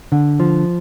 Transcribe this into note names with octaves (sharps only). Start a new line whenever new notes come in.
D3
F3